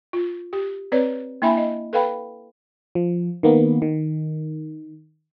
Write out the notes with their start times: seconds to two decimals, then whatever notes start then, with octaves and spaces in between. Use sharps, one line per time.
0.13 F4
0.53 G4
0.92 C4 B4 C#5 D5
1.42 A#3 D4 E4 E5 G#5 B5
1.57 D#5
1.93 A4 B4 F5 G5 B5
2.95 F3
3.43 D#3 A#3 B3
3.82 D#3